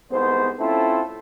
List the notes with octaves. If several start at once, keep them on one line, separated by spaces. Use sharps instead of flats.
C2 G#2 B3 C5
A3 C4 C#4 E4 F4 A4